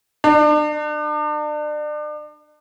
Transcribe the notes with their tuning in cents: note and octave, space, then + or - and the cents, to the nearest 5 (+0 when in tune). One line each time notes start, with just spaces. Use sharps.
D4 +35